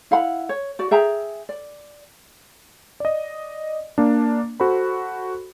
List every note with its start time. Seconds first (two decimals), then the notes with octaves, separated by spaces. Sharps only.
0.11 E4 F5 F#5 B5
0.49 C#5
0.79 F#4 D5
0.91 G#4 E5 G5 A#5
1.49 D5
3.00 D5 D#5
3.98 A#3 D4
4.60 F#4 A4 C5 B5